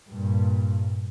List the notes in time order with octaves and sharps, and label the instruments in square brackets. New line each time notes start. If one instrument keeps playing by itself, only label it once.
[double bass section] G2 A#2